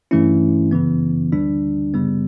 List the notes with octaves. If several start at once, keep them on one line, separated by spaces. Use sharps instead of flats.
G2 E3 A3 C#4 E4
F#2 C#3 E3 B3
D2 D3 G3 D4
F#2 C#3 G3 B3